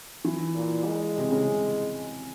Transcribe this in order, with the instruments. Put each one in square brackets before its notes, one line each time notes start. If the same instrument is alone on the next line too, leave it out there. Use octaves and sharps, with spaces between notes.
[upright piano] E3
[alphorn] A#2
G#3
[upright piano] C3
C#3
C3